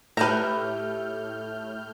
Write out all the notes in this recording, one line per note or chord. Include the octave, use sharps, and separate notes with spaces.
A2 A3 G4 B4 E5 A#5 F6 G6